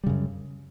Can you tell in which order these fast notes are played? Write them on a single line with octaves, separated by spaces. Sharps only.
G3 C#3 F#2